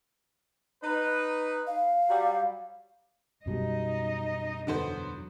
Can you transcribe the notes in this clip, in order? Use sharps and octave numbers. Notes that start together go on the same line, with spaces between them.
D#4 B4
F5
F#3 G3
F#2 B2 G3 D#4 D#5
E2 D3 F#3 B3 C5